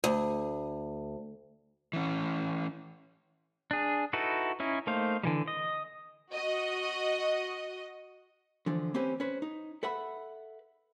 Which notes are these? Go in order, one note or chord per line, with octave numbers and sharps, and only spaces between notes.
D2
E3 C#4
D4 G#4
D#4 E4 F#4 A4 B4
C#4 D#4 E4
A3 A#3 D#4 C5 F5
D3 E3 G3
D#5
F#4 D#5
D3 E3 F3
A#3 C4 C#4 G4 B4
C#4 B4 C5
D#4
A4 B4 E5 F#5 B5